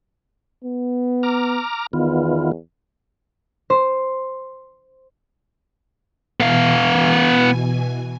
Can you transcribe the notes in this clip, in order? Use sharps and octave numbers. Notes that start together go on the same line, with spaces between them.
B3
A#5 D6 F6
E2 D#3 B3 F4
C5
B2 E3 B3 F5 G#5